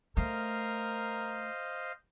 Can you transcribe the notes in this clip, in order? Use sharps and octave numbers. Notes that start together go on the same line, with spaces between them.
A3 A#4 C5 D#5 F5